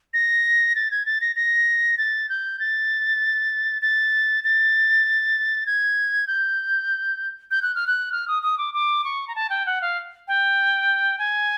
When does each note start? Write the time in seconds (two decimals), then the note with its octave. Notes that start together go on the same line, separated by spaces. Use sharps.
0.14 A#6
0.75 A6
0.91 G#6
1.06 A6
1.21 A#6
1.36 A#6
1.98 A6
2.29 G6
2.60 A6
3.82 A6
4.44 A6
5.67 G#6
6.27 G6
7.51 G6
7.62 F#6
7.75 F6
7.87 F#6
8.12 F6
8.28 D#6
8.43 D#6
8.58 D6
8.74 D6
9.04 C#6
9.28 A#5
9.35 A5
9.50 G5
9.66 F#5
9.82 F5
10.28 G5
11.19 G#5